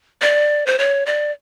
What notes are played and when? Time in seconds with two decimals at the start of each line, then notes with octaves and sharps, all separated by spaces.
0.22 D5
0.66 C5
0.79 C#5
1.06 D5